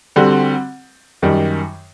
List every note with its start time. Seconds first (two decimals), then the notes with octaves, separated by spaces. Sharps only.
0.16 D3 G3 C4 F#4
1.22 F#2 D#3 G3